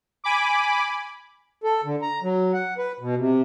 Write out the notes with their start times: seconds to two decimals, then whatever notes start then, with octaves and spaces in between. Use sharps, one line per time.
0.24 G#5 B5 D6
1.64 A4
1.84 D3
2.02 A#5
2.22 F#3
2.53 F#5
2.78 B4
3.00 B2
3.17 C3